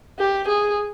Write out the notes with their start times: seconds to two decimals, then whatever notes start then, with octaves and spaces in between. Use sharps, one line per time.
0.19 G4
0.48 G#4